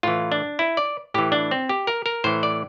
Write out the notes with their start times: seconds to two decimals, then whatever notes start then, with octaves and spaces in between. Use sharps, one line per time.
0.03 A2 E3 F4
0.32 D4
0.59 E4
0.77 D5
1.14 A2 E3 G4
1.32 D4
1.51 C4
1.69 G4
1.87 A#4
2.06 A#4
2.24 A2 E3 C5
2.43 D5